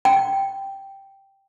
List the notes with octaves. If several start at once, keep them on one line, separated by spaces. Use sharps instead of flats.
G5